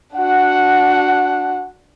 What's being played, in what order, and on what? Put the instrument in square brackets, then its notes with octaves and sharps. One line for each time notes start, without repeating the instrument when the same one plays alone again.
[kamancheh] D4 F#4 [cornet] F#5